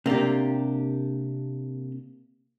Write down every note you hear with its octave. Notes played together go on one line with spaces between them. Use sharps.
C3 A#3 D4 G4